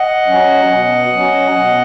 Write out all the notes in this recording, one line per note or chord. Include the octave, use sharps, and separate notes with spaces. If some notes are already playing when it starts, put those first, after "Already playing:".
Already playing: D#5 F#5
F#3 C#4
B2
F#3 C#4
B2